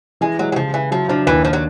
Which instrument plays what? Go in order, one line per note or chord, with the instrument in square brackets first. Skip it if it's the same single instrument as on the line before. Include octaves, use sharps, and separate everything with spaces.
[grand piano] E3 [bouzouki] G#3
[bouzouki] F#3 [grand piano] G#3
[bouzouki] F#3
[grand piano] C#3 [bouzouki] F3
[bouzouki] E3 [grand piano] E4
[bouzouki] F3 [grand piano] F#3
[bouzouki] F3 [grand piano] D4
[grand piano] D#2 [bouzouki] E3
[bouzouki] F3
F#3